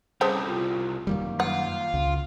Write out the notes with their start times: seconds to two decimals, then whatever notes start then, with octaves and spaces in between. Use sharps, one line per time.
0.21 C2 C#3 C4 A4
0.48 F4
1.07 F#2 D#3 G3 A#3
1.40 F4 F#5
1.94 C#2 A#3